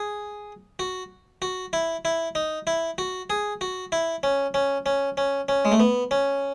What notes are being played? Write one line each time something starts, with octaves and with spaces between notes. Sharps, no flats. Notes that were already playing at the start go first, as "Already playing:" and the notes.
Already playing: G#4
F#4
F#4
E4
E4
D#4
E4
F#4
G#4
F#4
E4
C#4
C#4
C#4
C#4
C#4
G#3
A3
B3
C#4